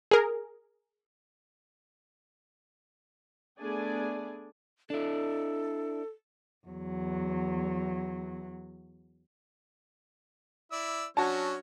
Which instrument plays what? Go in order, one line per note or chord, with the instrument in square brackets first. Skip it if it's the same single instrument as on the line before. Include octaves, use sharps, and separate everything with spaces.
[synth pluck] G#4 A#4
[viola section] A3 B3 D4 G#4 D5 G#5
[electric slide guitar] D4 E4 [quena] A4
[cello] E2 F#3
[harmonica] E4 D5 E6
[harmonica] F#3 C#4 C#5 [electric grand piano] D4 F#4 [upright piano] A5